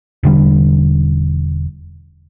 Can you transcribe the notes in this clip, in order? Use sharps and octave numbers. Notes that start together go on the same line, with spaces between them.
E1 D3 G3